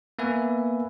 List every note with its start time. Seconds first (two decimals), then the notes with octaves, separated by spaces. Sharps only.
0.19 A#3 B3 B4 E5 G#5